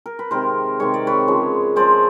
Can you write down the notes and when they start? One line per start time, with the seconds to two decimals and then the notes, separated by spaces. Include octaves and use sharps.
0.06 A#4
0.19 B4
0.31 C3 D#3 G#3 A#4 C5
0.80 C3 D#3 G#3 C#5
0.94 D5
1.07 B4 C#5
1.28 C#3 F3 G#3
1.76 C#3 F3 G#3 C5 D5